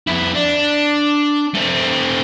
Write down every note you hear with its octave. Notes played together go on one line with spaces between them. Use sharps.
F2 E4
D4
A3 C4